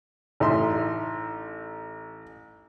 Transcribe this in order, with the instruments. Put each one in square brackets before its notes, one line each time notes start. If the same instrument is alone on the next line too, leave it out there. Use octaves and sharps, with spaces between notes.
[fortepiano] A1 D#4 E5 C6